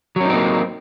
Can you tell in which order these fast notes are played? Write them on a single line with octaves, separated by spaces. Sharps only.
F#3 C#4 D#4 C4 A#3